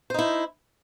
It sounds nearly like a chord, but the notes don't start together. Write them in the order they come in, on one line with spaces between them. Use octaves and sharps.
C5 D#4 E4